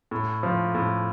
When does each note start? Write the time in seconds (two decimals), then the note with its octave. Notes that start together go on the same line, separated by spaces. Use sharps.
0.11 A2
0.43 F3
0.74 A2